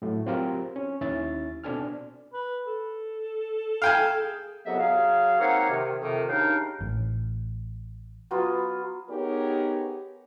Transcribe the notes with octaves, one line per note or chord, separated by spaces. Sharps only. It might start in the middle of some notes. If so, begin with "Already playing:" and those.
A2 F#3 A3
F#3 C4 F4 G4 A#4
C#4
D#2 C#4 E4 E5 A6
B2 C4 D4 A4 G#5 F6
B4
A4
F5 G5 G#5
G#4
C2 F2 F#3 B3 D#5 E5
F#3 G#4 F5
A#3 C4 D#4 C#5 F5 F#5
C3 D#3
F2 C3 D#3
D#2 C#3 D4 D#4 F5 G5
A1
F#3 B3 F4
B3 D#4 G4 G#4 A#4 C#5